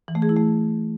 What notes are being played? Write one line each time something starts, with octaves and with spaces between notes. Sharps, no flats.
E3
A3
G#4
E4
A3